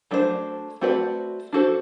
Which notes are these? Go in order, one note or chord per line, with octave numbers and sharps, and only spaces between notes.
F#3 A3 D4 F#4 C5
A3 C4 F#4 B4 D5
D4 F#4 A4 C5